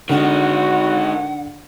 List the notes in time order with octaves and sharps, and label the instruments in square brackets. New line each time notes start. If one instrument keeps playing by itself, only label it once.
[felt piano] D3 [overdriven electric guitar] D#3 G#3 [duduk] F#4 [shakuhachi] F#5